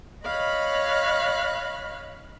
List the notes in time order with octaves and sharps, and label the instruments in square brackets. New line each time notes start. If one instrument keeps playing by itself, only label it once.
[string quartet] C#5 D#5 F5 B5 F#6